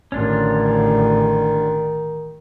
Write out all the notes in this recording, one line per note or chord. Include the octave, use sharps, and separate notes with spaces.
A1 D3 D#3 C#4 D4 F4